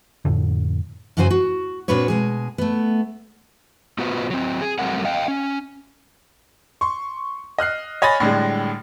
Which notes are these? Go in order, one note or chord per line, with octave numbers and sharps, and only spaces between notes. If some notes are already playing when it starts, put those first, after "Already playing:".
F2 A2 D3
F#2 C#3 F#3 F#4 C5 G#5
F#4
A#2 C4 D4 F#4 B4 C#5
B2 G#3 G#4
A3 B3
B3 F4 F#4 B4 C5
F#3 C4
G#4
F#3 G3 A3 C4 A#4 F#5
D#5 F5 G5
C#4
C6 C#6
D#5 F6 F#6 C7
C#5 D#5 G#5 B5 A6 A#6
A2 D3 G3 G#3